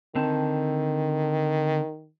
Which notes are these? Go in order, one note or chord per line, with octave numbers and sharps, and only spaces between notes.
D3 D#3 C4 A5